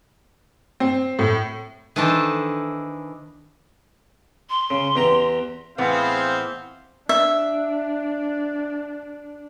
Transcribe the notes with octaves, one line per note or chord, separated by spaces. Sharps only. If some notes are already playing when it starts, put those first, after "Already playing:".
C4
A2
D#3 E3 D4 A4 C5 A5
C6
C#3
E2 G4 A#5
A2 E3 B3 C4 G#4 C5 F5
D4 E5